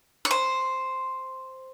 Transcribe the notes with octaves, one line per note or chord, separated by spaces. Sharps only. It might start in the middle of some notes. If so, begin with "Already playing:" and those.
C#5
C5